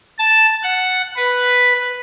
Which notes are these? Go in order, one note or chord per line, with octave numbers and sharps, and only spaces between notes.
A5
F#5
B4